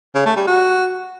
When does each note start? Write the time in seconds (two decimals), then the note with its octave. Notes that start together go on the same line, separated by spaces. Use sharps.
0.15 C#3
0.26 A3
0.36 G3
0.47 F#4